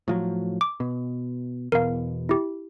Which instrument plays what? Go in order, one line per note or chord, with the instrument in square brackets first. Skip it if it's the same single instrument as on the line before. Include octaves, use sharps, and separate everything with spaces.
[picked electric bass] A2 F3 F#3
[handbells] D6
[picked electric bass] B2
[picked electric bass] E2 B2 [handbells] A#4 F5
[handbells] E4 G4